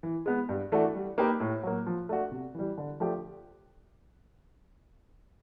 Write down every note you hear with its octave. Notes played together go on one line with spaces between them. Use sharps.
E3
G#3 B3
G2
E3 A3 D4 F#4
G3
A#3 D#4 G4 B4
A2
F#3 A#3
F3
A3 D4 F#4
C3
E3 G3
D3
F3 A3 D4 G4